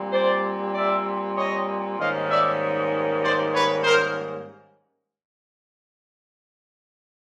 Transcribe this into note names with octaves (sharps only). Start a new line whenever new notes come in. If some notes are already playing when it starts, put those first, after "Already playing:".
Already playing: A#2 G3 C4
C5 D5
D5 E5
C#5 D#5
G#2 D#3 G3 A#3 C#4 D#5 F5
D5 E5
C5 D5
B4 C#5
A#4 C5